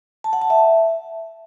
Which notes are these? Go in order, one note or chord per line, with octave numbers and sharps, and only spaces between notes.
A5
F#5
A5
E5